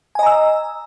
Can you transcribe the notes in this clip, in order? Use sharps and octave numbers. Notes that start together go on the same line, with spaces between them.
D#5 G#5 A#5 E6